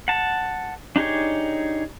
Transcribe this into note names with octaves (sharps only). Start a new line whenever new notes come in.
F#5 A5
D4 D#4 G4 G#4 C#5